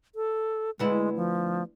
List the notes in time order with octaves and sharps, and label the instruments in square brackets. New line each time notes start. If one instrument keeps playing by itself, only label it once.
[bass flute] A4
[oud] D2 B3 E4 [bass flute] G#3
[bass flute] F3